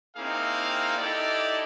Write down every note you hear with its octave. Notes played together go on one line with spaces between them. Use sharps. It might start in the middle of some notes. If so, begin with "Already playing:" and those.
A#3 C4 D#4 E4 G#4 F5
D#4 E4 G4 A4 D5